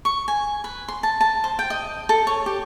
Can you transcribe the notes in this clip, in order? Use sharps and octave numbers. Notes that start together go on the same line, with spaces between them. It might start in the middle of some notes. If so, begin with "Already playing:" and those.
C#6
G#5
B4
C6
A5
A5
C5
G5
D#5
A4
C#5
G4